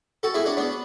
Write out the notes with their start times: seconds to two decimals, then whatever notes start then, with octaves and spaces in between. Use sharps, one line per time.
0.23 F#4 A4
0.34 E4 G#4
0.46 D4 F#4
0.57 B3 D4